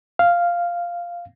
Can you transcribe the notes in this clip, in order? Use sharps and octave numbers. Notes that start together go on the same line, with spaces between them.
F5